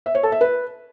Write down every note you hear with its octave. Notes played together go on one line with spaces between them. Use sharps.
E5
C#5
A4
E5
B4